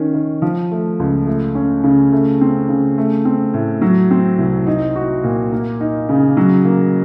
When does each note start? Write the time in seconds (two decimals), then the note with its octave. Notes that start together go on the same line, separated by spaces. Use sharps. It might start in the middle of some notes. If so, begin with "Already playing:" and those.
Already playing: D#3 C#4
0.14 D#3
0.42 F3
0.71 A3
1.00 C#2
1.27 A3
1.55 C#4
1.83 C#3
2.12 A3
2.41 C4
2.69 C#3
2.98 A3
3.25 C4
3.54 A2
3.82 F#3
4.11 C4
4.38 C2
4.67 D#4
4.96 F#4
5.23 A#2
5.52 A#3
5.81 D#4
6.09 C#3
6.37 F#3
6.65 A#3